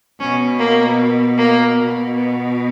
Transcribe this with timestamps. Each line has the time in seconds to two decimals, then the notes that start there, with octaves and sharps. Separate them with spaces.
0.19 B2 C#4
0.59 A#3
1.37 A#3
1.77 B2
2.16 B3